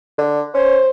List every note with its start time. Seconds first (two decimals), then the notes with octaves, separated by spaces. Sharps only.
0.18 D3
0.55 C#4 C5